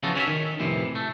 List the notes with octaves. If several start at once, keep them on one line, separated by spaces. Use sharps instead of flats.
C#3 E3 F3 B3 F#4 A4
C#4 E4 F#4 E5
D#3
F2 A2 C3 E3
A3